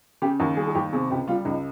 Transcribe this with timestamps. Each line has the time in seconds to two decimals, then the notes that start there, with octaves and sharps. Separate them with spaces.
0.22 C#3 G4
0.40 D#2 A#4
0.57 G3 G#4
0.67 G#4
0.75 D#2 G4
0.93 C3 G#4
1.10 C#2 G4
1.28 G3 F4
1.45 C#2 D#4